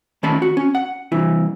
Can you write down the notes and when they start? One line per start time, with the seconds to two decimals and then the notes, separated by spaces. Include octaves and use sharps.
0.23 D#3 A3 C#4 A5 B5
0.42 F#4
0.57 C#4
0.75 F#5
1.12 C2 E3 E4